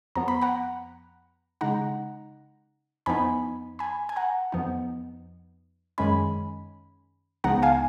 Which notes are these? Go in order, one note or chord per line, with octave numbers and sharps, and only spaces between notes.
F2 F3 B3 A#5
B5
F#5 A#5
C#3 G#3 D#4 F#5 A#5
F2 F3 B3 D#4 G#5 B5
G#5 B5
G#5
F#5 A#5
F2 F3 B3 D#4
F#2 D#3 G#3 C#4 G#5 B5
C#2 C#3 F3 B3 D#4 F#5 A#5
F5 G#5